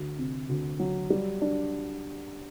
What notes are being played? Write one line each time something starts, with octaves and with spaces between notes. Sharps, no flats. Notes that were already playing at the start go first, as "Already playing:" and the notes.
Already playing: D2
C3
D2
F#3
G3
D4